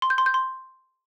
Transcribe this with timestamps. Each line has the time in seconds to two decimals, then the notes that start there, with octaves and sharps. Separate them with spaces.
0.02 C6
0.10 G6
0.18 C6
0.26 G6
0.34 C6